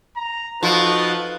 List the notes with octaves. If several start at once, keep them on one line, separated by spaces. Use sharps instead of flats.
A#5
F3 D#4 F#4 A4 B4